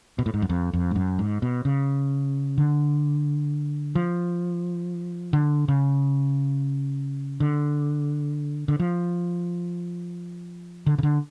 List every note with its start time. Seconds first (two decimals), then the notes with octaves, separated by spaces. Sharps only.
0.19 B2
0.26 A2
0.34 G#2
0.42 F#2
0.49 F2
0.73 F2
0.91 G#2
0.96 F#2
1.19 G#2
1.42 B2
1.65 C#3
2.58 D3
3.95 F3
5.33 D3
5.68 C#3
7.40 D3
8.68 D3
8.80 F3
10.86 D3
10.98 C#3
11.03 D3